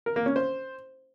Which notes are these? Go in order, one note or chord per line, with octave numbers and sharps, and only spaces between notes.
A#4
A#3
C#4
C5